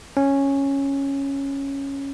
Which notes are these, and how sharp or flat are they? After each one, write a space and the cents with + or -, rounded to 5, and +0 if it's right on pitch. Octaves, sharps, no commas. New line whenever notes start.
C#4 -5